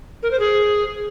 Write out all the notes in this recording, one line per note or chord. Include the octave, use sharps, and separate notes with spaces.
A#4
C5
G#4